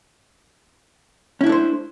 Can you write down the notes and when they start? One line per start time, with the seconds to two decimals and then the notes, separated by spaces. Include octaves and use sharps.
1.41 C#4
1.44 E4
1.46 D4
1.49 A3
1.52 C5